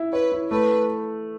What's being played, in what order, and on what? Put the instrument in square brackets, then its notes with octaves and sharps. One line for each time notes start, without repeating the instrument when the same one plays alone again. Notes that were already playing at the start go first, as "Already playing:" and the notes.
Already playing: [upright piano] E4 E5
[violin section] B4 [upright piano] C#5
[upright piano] E4
[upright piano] A3 [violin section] B4